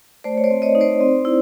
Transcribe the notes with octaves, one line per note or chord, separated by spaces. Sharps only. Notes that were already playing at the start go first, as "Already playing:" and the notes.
A3 C5 D5
C#5
C5 D5
C4
C#5 D#5
D#4
C5 D5
C4
E4